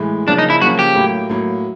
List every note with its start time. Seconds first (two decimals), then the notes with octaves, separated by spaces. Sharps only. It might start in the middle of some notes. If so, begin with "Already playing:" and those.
Already playing: A2 E3 G#3
0.27 C#3 F3 A#3 C#4 D4
0.38 D#4
0.50 E4
0.61 C#3 F3 A#3 C#4 F#4
0.79 G4
0.95 A2 F#3 A#3
1.29 A2 F#3 A#3